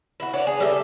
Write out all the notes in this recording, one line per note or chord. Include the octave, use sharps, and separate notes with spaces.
E4 F#4
D4 F#4 C#5
G#4
G3 A4 D#5 E5